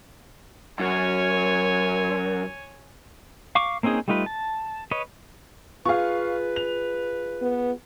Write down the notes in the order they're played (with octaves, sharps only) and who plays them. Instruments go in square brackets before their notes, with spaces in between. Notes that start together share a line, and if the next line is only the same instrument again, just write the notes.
[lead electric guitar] F#2 [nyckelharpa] C#5 G#5
[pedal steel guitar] F5 C#6 D6
A#3 C4 C#4 D#4 G#4
G3 A3 D#4 F4 B4
A5
B4 C#5 D#5
[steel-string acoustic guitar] F4 G#4 [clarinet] B4 [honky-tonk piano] F5 C#6
[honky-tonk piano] F7
[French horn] B3